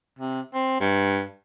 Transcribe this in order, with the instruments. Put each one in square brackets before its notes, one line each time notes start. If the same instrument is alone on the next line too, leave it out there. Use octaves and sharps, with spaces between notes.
[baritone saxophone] C3
C4
G2